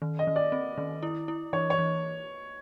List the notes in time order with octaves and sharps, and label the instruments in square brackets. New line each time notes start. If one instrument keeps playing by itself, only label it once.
[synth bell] D#3
[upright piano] D#5
[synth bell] D#3
[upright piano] D5
[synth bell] C4
D#3
E4
E4
[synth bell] E3 [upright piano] C#5
[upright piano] C#5
[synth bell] E3